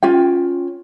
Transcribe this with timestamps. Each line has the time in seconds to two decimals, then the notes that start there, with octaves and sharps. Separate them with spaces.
0.03 C#4 F4 G5